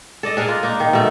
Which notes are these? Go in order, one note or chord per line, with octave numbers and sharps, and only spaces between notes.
A4 D5 D#5
D4 G#4 A#4
F4
A#3 D#4
D#3
B2 A3